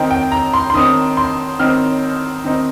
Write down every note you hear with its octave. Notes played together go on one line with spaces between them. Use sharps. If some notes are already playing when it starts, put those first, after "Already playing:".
Already playing: D#3 C4 D#4 G5
G5
A#5
C6
C6
D#3 C4 D#4 D#6
C6
D#3 C4 D#4 F6
D#3 C4 D#4